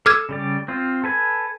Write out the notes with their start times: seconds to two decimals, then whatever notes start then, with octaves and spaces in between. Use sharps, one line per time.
0.06 A4 D6 E6 F6 G#6
0.29 C#3 G3 D5
0.68 C4 F4
1.04 A4 B4 G#5